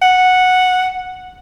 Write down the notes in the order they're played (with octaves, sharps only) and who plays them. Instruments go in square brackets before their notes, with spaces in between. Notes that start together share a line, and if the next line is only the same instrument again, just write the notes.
[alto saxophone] F#5